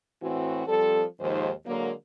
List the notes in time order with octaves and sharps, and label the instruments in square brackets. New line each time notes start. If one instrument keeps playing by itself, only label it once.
[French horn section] A2 E3 C4 F#4
F3 G3 C4 A4
D#2 G#2 D#3 F3 G#3 C5
D3 F#3 G#3 A#3